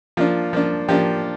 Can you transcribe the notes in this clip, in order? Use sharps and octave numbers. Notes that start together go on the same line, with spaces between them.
F3 A#3 D4 F4
F3 A#3 D4
F3 A#3 D4 G4